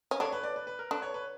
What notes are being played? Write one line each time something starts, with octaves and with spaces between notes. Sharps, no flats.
C#4
D3 D4 C#5
B4
D5
B4
B4
A#4
D3 D4 B4
C#5
B4